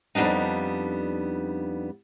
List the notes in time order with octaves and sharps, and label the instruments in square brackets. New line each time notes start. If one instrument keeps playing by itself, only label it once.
[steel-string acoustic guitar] F2 G3 B3 D4 D#4